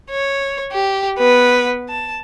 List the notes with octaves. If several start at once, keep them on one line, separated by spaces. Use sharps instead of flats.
C#5
G4
B3 B4
A5